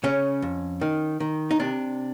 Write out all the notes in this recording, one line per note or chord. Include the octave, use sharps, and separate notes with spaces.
C#3 C#4
F2
D#3
D#3
D#4
C3 D4